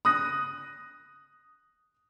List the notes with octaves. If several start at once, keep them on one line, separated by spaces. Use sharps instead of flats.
D#6 F#6 A#6